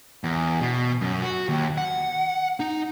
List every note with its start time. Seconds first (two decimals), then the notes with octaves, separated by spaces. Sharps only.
0.24 E2
0.61 B2
1.01 F#2
1.22 F#4
1.49 D#2
1.78 F#5
2.60 D#4